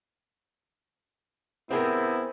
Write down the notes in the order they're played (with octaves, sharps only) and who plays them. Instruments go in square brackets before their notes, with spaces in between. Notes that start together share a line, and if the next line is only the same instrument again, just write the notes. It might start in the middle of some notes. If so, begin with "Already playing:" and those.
[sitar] C3 [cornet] B3 [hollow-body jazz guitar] C4 G#4 A#4 [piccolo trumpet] E4